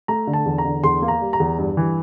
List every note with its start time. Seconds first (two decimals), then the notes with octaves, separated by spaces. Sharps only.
0.08 A3 A#5
0.27 D3
0.33 A5
0.46 E2
0.58 A#5
0.65 D3
0.84 E2 C6
1.02 A#3
1.08 A#5
1.21 G3
1.33 A#5
1.40 E2
1.58 G2
1.77 E3